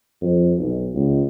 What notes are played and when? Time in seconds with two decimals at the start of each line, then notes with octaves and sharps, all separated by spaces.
0.21 F2
0.58 B1
0.94 C#2